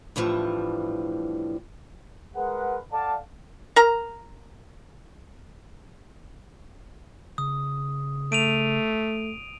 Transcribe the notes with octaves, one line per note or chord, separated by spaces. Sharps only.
A2 D3 E3 F3 G3
G#3 G#4 A#4 B4 F#5
A4 D5 F5 F#5 A5
A#4 A#5
C#3 D#6
A3 D7 D#7 F7